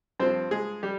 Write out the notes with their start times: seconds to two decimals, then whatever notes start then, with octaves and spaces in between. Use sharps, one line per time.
0.20 G2 F3 C4 C5
0.51 G#3 G#4
0.83 G3 G4